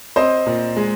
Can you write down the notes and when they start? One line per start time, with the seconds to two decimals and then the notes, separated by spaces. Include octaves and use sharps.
0.16 C4 C5 D#5
0.46 A#2
0.77 G#3